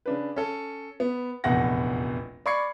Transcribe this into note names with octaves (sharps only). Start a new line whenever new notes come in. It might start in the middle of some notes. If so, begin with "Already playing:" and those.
C#3 D4 B4
C#4 A4
B3
F1 A#1 E2 F#5 A#6
D5 B5 C#6 G#6 C7 C#7